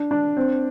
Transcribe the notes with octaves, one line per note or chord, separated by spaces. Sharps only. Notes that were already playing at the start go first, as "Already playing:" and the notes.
Already playing: D4
D4
C4